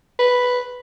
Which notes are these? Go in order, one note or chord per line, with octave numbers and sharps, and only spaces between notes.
B4